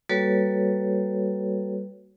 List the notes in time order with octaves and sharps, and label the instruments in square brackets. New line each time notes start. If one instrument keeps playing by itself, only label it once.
[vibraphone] G3 A#3 F#4 A4 B4 C#5